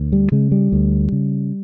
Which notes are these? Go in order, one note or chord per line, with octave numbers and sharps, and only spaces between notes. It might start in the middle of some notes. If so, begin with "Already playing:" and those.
Already playing: D2
G3
C#3 G#3
G3
D2
C#3